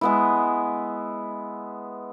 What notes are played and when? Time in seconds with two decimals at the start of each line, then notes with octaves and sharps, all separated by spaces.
0.01 G#3 B3 E4